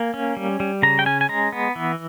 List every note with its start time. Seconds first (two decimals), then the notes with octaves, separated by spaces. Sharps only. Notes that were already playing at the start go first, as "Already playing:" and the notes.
Already playing: A#3 G#5
0.14 C#4
0.37 G3
0.60 G3
0.82 C#3 A#5
0.99 G5
1.06 C#4 G#5
1.21 G#5
1.29 G#3 A#5
1.52 B3
1.76 E3